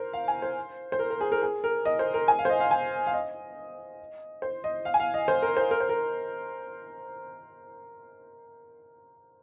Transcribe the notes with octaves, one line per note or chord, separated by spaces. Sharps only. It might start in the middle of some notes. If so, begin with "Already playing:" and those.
Already playing: A#4 C5
F5
G#5
C5
C5
A#4
A#4
G#4
A#4
G#4
A#4
D#5
C5
A#4
G#5
F5
C5
D#5
F5
G#5
F5
D#5
C5
D#5
F5
G#5
F5
D#5
C5
A#4
C5
A#4
C5
A#4